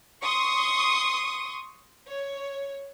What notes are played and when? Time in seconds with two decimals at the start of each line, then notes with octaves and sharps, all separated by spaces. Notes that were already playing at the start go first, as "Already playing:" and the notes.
0.23 C6 C#6 D#6
2.08 C#5